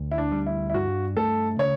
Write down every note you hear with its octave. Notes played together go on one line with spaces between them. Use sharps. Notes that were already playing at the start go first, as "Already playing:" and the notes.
Already playing: D2
E4
D4
G3
E4
E4
G2 F#4
A3 A4
C#3 C#5